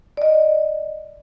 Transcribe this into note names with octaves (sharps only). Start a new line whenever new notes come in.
D5 D#5